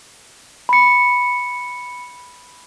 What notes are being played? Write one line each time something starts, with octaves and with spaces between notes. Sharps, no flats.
B5 C#7